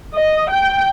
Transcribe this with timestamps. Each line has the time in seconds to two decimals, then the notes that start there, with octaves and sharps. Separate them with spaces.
0.15 D#5
0.51 G5